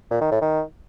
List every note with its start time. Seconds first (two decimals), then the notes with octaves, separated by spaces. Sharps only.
0.11 A#2
0.21 D#3
0.31 A2
0.41 D#3